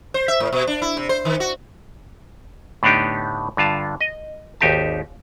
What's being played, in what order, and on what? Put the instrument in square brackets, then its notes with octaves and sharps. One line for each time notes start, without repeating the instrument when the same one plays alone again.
[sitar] C5
E5
A2
B2
D4
E4
C3
C5
D#3
F#4
[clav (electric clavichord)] A2 D3 B3 D4 D#4 G4
G2 D3 F4 A5
D#5
G#1 D#2 D#4 G4 E5 A5